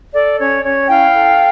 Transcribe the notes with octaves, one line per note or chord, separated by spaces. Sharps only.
A4 D5
C#4 C#5
C#4 C#5
E4 F5 G5
A4